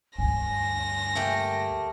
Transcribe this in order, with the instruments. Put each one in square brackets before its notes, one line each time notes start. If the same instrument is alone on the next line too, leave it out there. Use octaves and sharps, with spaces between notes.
[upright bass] D2 G2 [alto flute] G#5 [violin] A#6
[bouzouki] A3 A#3 G4